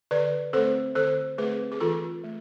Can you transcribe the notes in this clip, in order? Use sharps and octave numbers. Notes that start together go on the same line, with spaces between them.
D3 B4 D5
A3 C4 A4 C5
D3 A4 C5
A3 C4 G#4 B4
G#4
E3 F4 A4
A3